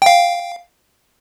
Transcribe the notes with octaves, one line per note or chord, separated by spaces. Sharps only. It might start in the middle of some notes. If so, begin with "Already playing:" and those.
F5 G5